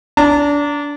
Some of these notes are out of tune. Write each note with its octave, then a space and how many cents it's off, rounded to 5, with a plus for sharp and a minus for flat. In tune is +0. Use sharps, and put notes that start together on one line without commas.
D4 -25 A#5 -40